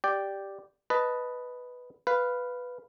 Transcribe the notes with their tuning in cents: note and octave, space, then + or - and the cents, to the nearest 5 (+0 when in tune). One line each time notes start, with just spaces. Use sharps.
G4 +0 D5 +0 G5 +0
B4 +0 D#5 +0 A5 +0
B4 +0 F5 -5